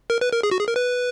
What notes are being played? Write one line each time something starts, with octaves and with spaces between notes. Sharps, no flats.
A#4
B4
A#4
G#4
F#4
G#4
A#4
B4